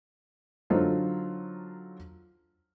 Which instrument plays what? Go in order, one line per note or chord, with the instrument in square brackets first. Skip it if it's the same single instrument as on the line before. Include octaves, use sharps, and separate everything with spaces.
[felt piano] D3 F#3 D#4 F4 A4 C5